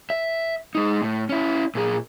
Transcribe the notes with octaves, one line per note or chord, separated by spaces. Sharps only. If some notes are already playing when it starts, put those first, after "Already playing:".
E5
G#3 D#4
A2
C#4 E4
A#2 G#4